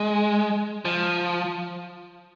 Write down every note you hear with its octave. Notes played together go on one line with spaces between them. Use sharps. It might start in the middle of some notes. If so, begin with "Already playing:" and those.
Already playing: G#3
F3